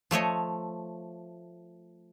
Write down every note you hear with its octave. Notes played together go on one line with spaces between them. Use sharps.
F3 A3 C#5 D#5